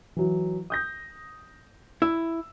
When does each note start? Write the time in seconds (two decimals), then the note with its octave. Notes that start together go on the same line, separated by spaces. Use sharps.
0.16 E3 F#3
0.70 D#6 G6 A#6
2.02 E4 E6